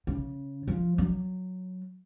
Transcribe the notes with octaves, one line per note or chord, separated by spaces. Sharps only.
C#3
F3
F#3